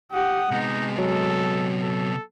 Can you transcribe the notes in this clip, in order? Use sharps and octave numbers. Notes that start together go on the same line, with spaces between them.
G4 F#5 D#6
C3 G#3 B3 D#4
F#3 A4
A4